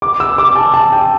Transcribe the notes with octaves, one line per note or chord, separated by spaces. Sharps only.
D6
E6
D6
A5
A5
G5